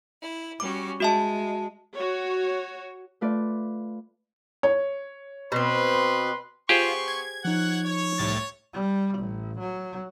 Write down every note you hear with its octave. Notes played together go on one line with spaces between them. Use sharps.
E4
G3 C#4 F#4 D6
G#3 F#4 E5 A5
F#4 C#5
A3 F4 B4 D5
C#5
B2 C4 B4 C6
B3 F4 G4 G#4 C5 C6 C#6
G#6
F3 D#4 C#5 F#5
C#5
C2 A2 A6
G3
A1
F#3